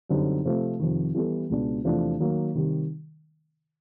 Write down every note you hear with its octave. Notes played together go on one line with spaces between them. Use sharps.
F#2 D3 G3 C4 D#4
C3 F3 A3 C4
F2 C3 D#3
E3 G3 B3 E4 A4
C#2 B2 G#3 B3 D4
E2 C3 F3 A3 D4
D#3 F#3 A#3
C3 D#3 G3